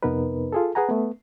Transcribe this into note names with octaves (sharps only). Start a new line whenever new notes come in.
F2 C3 B3 D#4 A#4 B4
F4 G#4 A4
G#4 B4 F#5 G#5 A#5
A3 B3